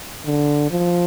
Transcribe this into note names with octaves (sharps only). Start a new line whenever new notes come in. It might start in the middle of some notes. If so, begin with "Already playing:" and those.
D3
F3